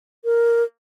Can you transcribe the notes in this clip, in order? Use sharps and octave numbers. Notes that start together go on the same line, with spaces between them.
A#4